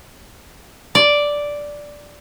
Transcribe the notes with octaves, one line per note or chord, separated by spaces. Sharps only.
D5